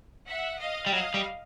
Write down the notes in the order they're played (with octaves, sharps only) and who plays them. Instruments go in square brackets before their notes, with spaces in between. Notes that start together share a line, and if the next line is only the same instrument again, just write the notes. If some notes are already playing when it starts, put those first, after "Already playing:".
[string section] E5 F#5
D#5 F5
[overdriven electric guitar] G3
[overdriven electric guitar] F#3 [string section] D#5 F5
[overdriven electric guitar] G3